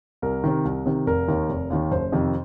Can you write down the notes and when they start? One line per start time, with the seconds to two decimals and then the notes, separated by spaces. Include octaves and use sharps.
0.22 C2 A#4
0.44 C3 D#3
0.65 C2
0.86 C3 D#3
1.06 F1 A#4
1.28 D#2 D#3
1.49 F1
1.70 D#2 D#3
1.91 F#1 C5
2.12 F2 C3 D#3